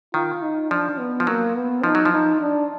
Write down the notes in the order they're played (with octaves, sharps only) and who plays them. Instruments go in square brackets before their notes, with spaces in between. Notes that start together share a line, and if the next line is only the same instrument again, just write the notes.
[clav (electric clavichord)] D#3 [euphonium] F4
[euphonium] D#4
[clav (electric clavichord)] F3 [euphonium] D4
[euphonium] B3
[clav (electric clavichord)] F3
[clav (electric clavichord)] F#3 [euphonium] A#3
[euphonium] B3
[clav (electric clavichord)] F3 [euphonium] D#4
[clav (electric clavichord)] F#3
F3
[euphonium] D#4
D4